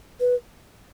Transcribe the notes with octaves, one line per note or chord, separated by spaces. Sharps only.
B4